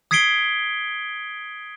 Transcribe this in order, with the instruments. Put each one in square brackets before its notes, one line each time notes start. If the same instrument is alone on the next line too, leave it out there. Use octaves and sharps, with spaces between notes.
[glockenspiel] D#6 G#6 B6 C7 D7 G7